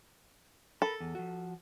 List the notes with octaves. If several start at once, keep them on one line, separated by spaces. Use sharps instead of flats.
A4 A#4 B5
E2
F3 F#4